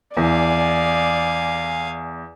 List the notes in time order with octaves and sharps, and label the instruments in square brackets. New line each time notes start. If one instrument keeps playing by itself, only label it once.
[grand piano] E2 [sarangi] D5 [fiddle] F5 G#5